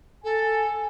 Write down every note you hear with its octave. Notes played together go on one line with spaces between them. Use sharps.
A4 G#5